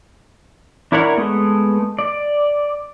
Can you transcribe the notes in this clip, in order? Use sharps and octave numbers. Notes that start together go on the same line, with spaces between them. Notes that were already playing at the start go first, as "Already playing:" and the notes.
D4 E4 A#4 C#5 F#5
G#3 A3 B3
D5